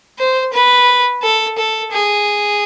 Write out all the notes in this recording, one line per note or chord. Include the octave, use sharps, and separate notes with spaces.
C5
B4
A4
A4
G#4